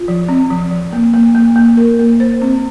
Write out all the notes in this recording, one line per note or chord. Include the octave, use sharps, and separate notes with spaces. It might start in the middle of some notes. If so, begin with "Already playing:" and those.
Already playing: F4
F3
C4
F3
F3
A#3
A#3
A#3
A#3
A#4
A#3
C5
C4